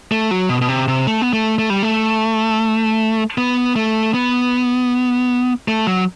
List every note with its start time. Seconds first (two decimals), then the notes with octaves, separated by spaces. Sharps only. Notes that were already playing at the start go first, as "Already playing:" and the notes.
0.12 A3
0.31 F#3
0.49 B2
0.61 B2
0.69 C3
0.88 C3
1.07 A3
1.22 B3
1.33 A3
1.59 A3
1.70 G3
1.82 A3
3.38 B3
3.76 A3
4.14 B3
5.68 A3
5.87 F#3